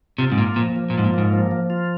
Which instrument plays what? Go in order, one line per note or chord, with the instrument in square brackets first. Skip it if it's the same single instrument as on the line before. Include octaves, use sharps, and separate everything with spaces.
[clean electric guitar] C3 [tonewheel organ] F4
[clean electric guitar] G#2
[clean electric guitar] A#2 [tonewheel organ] A#3
[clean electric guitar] A#2 [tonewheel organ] F3
[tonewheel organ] F3
[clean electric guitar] A#2
[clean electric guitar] G#2 [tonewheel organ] F4
[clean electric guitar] A#2
[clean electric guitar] G#2 [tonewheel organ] A#3
[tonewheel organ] F3
F3
F4